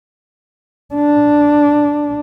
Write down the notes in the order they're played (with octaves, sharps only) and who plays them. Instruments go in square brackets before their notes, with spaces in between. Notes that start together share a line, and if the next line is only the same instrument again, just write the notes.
[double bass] D4